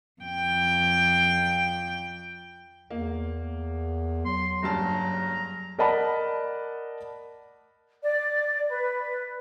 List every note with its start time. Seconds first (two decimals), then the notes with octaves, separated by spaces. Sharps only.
0.22 F2 G5
2.90 E2 A#3
4.25 F#3 C6
4.63 F#1 G2 A5 A#5
5.79 A#4 D5 D#5 F#5 A5 B5
8.03 D5
8.70 B4